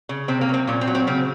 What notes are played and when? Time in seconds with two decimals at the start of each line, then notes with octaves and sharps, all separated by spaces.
0.09 C#3
0.28 C3 C4
0.41 A#3
0.49 F#3 C4
0.67 A#2 C#4
0.81 C4
0.87 F#3
0.95 C4
1.07 C#3 C4